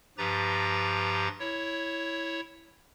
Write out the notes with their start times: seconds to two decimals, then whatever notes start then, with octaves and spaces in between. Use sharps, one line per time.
0.18 G2 F3 G4 B4 A#5 A6
1.40 E4 C#5